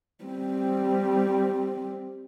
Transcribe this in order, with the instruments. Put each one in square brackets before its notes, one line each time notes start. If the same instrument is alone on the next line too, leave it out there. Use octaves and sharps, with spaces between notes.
[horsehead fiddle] G3 C4